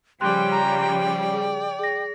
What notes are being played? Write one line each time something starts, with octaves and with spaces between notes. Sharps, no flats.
C#3 F3 G3 G5 C6 F#6
A#5
D5
G#4
G#4 A#6